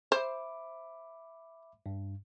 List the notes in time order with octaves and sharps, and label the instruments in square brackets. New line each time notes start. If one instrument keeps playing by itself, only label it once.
[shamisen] C5 [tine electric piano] E5 B5 D6
[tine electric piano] G2